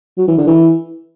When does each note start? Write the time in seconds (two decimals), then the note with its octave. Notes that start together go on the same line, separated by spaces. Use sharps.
0.17 F#3
0.28 E3
0.38 D3
0.47 E3